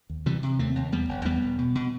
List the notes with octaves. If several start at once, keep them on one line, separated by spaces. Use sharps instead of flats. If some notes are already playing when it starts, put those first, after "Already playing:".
D#2
C3 E3 G3
C3
D#2 A3 C4
D#2
E2 G3 B3
F#1
E2 G3 B3
E1
B2
B2